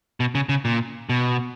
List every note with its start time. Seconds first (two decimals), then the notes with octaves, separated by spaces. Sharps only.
0.20 B2
0.35 C#3
0.49 C#3
0.65 A#2
1.09 B2